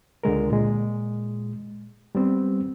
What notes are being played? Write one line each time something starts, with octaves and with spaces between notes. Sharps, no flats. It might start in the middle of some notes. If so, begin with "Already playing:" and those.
C#2 D3 G#3 A#4
A#2 G#3
G3 B3 C4